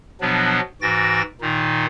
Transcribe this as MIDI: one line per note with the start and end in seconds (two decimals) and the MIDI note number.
0.21 0.60 47
0.21 0.60 53
0.21 0.60 54
0.21 0.60 59
0.21 0.60 62
0.82 1.22 44
0.82 1.22 52
0.82 1.22 66
0.82 1.22 79
0.82 1.22 93
0.82 1.22 94
1.41 1.86 46
1.41 1.86 51
1.41 1.86 63